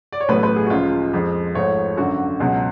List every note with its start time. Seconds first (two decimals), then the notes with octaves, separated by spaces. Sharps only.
0.12 D5
0.21 C#5
0.28 A1 A2 F#3 B3 B4
0.43 B4
0.56 G#4
0.66 F#4
0.70 C#2 C#3 F3 F4
1.13 F2 F3 G#3
1.55 G#1 G#2 F3 A3 C#5
1.97 G#1 F#2 D3 F#4
2.40 C#2 B2 F#3